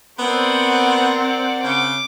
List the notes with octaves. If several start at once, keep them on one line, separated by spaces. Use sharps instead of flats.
B3 C4 A#4 C5 D5 F#5
C#3 D6